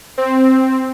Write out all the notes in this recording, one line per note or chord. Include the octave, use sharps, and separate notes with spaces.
C4